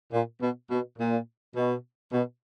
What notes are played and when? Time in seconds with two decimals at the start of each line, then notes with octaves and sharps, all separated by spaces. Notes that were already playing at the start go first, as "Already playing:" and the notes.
0.12 A#2
0.41 B2
0.70 B2
0.99 A#2
1.56 B2
2.13 B2